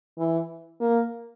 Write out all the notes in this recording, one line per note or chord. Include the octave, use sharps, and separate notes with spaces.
E3
A#3